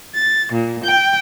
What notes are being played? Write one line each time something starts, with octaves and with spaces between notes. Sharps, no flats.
A6
A#2
G5